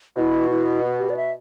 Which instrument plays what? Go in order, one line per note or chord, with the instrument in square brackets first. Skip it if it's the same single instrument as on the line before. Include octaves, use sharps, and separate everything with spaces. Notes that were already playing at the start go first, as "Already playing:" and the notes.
[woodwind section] B2 [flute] E4
[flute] E4
F#4
G4
D5
E5